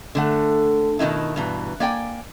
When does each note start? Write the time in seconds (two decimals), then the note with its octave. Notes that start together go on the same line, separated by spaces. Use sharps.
0.15 D3 A3 F#5
0.99 B2 D#3 E3 D#4 E4
1.36 G2 B2 E3 A#5
1.80 A#3 D5 G5 G#5